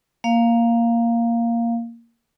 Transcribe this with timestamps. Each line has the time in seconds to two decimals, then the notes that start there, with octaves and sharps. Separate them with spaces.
0.24 A#3 F5